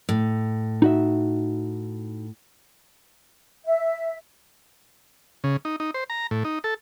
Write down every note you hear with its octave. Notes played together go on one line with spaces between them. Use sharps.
A2
D#4 F#4 E5
E5
C#3
D#4
D#4
C5
A#5
A2
D#4
A4